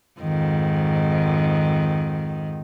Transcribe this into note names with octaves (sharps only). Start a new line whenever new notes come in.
F2 G#2 D#3